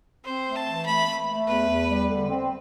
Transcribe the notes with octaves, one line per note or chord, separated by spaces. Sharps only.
C4 C5
A3
A5
E3
A3 B5
A3
A3
E2 B4
E2
G3
D3
C4